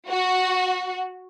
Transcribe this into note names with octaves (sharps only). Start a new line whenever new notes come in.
F#4